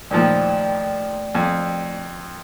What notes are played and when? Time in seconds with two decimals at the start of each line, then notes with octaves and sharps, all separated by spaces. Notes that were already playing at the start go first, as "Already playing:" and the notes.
0.11 D#2 A#2 F3 A3 D5 G5
1.35 F2